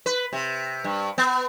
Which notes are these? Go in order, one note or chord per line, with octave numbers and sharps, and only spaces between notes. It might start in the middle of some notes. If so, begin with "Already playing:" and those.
B4
C3
G2
B3